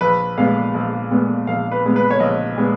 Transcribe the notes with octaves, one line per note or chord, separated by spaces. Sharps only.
A#1 B4
A#2 G#3 B3 F5
A#1
A#2 G#3 B3
A#1 F5
B4
A#2 G#3 B3
B4
C#5
A#1 D#5
A#2 G#3 B3